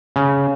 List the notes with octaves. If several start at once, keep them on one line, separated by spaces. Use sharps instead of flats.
C#3